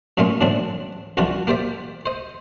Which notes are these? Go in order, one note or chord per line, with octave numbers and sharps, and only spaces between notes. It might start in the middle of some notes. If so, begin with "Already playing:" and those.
F#2 A#2 A3 A#3 C#4 C6
F#2 A2 D3 E3 C4 D4
C2 F2 E3 D4 F4 F#4
A#3 G4 C5 D5 E5
C5 D#5